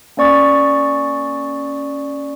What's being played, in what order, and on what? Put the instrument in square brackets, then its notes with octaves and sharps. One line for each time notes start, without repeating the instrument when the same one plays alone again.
[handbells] A#3 C#4 D5 C#6 D#6 A6